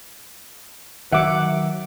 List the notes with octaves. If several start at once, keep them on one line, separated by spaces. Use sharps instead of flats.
D#3 F#3 E5 F#5 D6